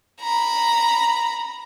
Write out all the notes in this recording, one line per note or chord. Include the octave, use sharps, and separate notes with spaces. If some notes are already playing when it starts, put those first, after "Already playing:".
A#5 B5